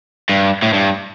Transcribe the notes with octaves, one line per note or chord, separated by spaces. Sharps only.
G2
A2
G2